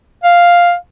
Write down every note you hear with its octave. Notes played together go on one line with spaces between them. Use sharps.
F5